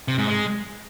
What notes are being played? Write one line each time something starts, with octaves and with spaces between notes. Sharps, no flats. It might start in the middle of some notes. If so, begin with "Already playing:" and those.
C3
G#2
G#3